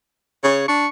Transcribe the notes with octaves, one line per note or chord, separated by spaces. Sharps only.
C#3 C#5
D4 C#6